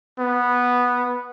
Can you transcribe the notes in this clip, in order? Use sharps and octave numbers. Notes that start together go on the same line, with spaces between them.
B3